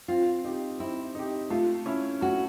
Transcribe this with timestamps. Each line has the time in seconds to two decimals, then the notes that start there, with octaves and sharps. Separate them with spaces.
0.08 C4 F4
0.44 D#4 G4
0.79 C4 E4
1.15 D#4 G4
1.50 A3 F4
1.86 C#4 E4
2.21 A3 F#4